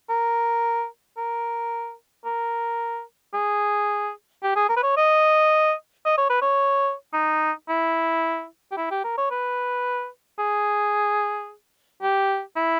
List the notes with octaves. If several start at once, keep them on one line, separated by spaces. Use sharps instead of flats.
A#4
A#4
A#4
G#4
G4
G#4
A#4
B4
C#5
D#5
D#5
C#5
B4
C#5
D#4
E4
G4
E4
G4
A#4
C#5
B4
G#4
G4
E4